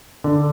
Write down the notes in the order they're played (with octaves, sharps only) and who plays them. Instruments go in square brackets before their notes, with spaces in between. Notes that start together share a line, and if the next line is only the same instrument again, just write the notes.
[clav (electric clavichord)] D3